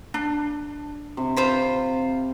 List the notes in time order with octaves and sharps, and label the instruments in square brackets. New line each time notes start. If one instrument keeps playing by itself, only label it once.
[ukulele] D4
[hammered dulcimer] C3 [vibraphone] C4
[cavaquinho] F4 C5 B5